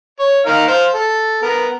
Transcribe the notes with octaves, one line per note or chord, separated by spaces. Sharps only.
C#5
D#4 A#4 F5
C5 F5
A4
B3 A#4